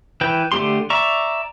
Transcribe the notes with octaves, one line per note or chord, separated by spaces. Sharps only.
E3 B4 G5
D3 A3 D4 G4 C6
D5 E5 A#5 C#6